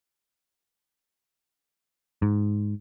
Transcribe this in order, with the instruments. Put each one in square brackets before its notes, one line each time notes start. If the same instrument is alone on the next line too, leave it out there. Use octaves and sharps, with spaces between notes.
[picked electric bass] G#2